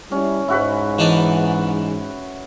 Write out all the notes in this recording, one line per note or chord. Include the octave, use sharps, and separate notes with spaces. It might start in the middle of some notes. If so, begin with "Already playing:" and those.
G3 C#4 E4
G#2 E4 F#4 B4
E3 D4 D#4